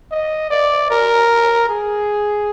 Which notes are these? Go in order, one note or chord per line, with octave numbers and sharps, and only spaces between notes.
D#5
D5
A#4
G#4